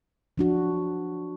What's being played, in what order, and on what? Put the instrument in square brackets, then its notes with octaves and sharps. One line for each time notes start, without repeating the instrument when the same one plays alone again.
[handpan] F3 D4 F#4